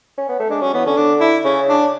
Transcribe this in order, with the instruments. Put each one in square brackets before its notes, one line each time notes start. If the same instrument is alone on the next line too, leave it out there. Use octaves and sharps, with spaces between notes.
[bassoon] C#4
B3
A3
[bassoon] G#3 [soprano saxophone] D4
[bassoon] F#3 [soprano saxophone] C#4
[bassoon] E3 [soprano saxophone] B3
[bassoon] D3 [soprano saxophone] C#4
[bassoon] D3 [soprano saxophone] D4
[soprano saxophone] E4
[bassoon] C#3 [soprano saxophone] C#4
[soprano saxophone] D4